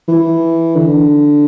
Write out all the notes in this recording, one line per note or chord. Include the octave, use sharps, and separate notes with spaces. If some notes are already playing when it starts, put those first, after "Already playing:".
E3
D3